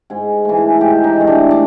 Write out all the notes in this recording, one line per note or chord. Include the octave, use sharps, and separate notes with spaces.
G#2 G#4
E3 A3
G#4
G#2 G4
D#4
E3 A3
D4
D4